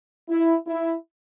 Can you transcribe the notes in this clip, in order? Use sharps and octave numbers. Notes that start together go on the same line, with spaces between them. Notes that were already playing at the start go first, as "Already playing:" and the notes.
E4
E4